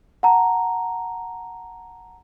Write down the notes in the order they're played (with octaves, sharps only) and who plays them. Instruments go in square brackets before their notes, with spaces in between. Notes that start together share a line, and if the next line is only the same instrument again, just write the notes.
[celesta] F#5 A5 A#5